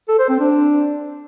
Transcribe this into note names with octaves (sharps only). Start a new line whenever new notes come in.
A4
C5
C4
D4